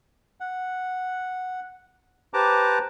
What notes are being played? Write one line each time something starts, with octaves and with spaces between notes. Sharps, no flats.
F#5
G4 B4 C5 A5 A#5 D6